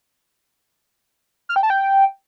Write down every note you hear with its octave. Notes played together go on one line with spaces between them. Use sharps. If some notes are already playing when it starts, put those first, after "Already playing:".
F6
G5
A5
G5